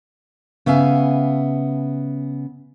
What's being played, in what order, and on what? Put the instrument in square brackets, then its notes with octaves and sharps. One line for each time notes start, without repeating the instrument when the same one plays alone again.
[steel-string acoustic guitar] C#3 B3 E5 F5 G#5